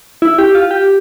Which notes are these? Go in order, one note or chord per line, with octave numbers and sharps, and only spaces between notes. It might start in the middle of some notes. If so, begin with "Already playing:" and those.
E4
G4
F4
G4